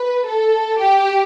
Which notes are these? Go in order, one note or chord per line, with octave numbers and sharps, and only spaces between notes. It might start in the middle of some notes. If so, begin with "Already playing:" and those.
Already playing: B4
A4
G4